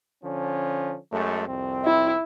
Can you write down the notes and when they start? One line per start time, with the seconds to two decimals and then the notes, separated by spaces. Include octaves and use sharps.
0.24 D3 F3 C#4
1.12 F#2 G#3 A3
1.49 C2 F2 C4
1.84 E4